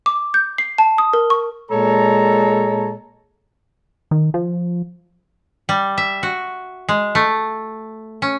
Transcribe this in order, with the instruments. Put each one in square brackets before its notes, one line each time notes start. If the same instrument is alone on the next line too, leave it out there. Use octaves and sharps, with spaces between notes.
[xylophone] D6
G6
C7
A5
D#6
A#4
C#6
[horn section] A#2 G#3 A4 C#5 A5 A#5
[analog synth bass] D#3
F3
[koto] G3
E5
F#4
G#3
A3
C#4